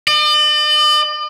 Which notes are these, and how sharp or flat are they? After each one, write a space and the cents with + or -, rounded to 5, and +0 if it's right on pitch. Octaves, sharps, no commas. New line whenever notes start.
D5 +45